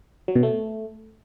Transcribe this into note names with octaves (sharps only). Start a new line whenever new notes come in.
F#3
B2
A3